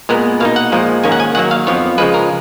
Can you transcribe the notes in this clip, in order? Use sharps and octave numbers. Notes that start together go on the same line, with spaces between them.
A#2 G#3 B3 A#4
B2 A#3 D#4 F5
F#5
A#2 F3 G#3
G#2 D#3 A#3 C#4 G#5
F#5
G#5
D#3 F#3 A#3 F#5
F5
F2 F3 B3 C#5
C#3 F3 G#3 B4
A#4